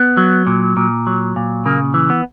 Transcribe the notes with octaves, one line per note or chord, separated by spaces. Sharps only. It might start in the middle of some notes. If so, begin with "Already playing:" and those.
Already playing: B3
F#3
A#2
A#2
F#3
A#2
C#3 A#3
E3
B3